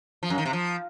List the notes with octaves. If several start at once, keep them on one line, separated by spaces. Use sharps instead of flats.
F3
F#2
D#3
C3
F3